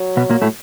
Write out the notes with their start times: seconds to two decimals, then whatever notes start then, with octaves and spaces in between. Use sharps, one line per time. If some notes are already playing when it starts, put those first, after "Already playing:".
Already playing: F#3
0.17 B2 B3
0.30 A#2 A#3
0.42 A2 A3